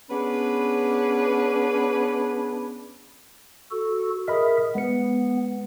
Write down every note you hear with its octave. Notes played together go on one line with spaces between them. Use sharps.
B3 C#4 D4 G#4 B4
F#4 A4
G#4 A#4 D#5 E5 B5
G#3 B3 B4 C#7